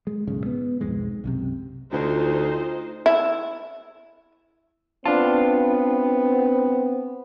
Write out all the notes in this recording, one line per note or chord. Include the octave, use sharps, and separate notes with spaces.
G#3
D1 B1 G#2 C#3
B3
B1 F2 G#2 G#3
B1 F#2 C3
D2 D#4 F4 C5
E4
B3 C4 D4 F4 A5